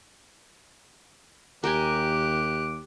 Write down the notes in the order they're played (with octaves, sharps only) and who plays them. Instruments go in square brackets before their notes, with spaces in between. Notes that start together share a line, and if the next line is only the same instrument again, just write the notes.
[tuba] D#2 [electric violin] G4 F#6 [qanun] A#4 G5 G#5 [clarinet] D6